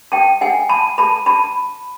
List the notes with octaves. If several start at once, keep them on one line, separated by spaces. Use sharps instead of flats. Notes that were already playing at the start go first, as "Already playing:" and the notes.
G5 A5
F#5 G#5
A5 B5
A5 B5
A5 B5